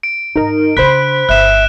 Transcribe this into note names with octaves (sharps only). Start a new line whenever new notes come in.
D7
G#2 D#4 A#4
C#3 D4 C5 B5 F#6 B6
G1 E5 F#6 E7